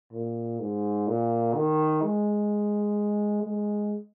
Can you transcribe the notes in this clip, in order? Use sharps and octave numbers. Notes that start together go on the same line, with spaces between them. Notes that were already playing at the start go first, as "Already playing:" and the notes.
A#2
G#2
A#2
D#3
G#3
G#3